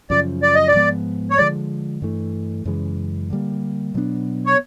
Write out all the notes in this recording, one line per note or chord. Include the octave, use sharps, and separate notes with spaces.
F#2 C#3 F3 D5
D5
D#5
D5
G#2 F3 G#3 B3
C#5
D3 F3 G#3 D5
G2 E3 A3
F#2 C#3 E3 G#3
D3 G3 A#3
B2 F#3 B3 D4
C#5